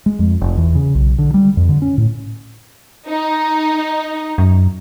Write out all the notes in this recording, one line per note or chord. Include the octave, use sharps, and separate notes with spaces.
G#3
F2
F1
E2
C#3
B1
D3
G3
F2
D3
C#4
A2
D#4
F#2